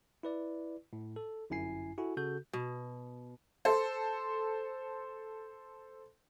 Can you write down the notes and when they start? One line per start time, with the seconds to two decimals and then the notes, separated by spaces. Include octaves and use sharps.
0.23 E4 B4 D5
0.93 A2
1.16 A4
1.50 G1 F#2 E4 G#5 C7
1.98 E4 F#4 A4 G#5
2.17 C#3 F#4 A4 G6
2.53 B2
3.65 A4 C5